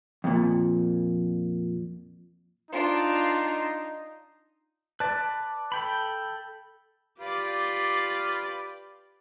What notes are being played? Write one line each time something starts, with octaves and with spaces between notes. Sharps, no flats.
F2 A#2
D4 D#4 F4
B4 D5 A5
A4 G5 B5
F4 G4 B4 D5